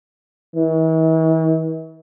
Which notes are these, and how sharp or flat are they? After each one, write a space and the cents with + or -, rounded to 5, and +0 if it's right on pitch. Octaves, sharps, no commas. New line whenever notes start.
E3 -45